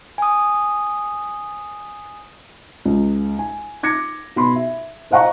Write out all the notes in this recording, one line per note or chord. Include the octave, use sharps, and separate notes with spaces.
G#5 D#6
C#2
G#5
D6 G#6 A#6 C#7
B2 B5 C6
E5
C5 D#5 F5 F#5 A#5 C#6